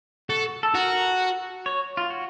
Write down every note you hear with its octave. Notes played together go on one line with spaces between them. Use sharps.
F#4 A4
A4
F#4 A#4
C#5
F4
F#4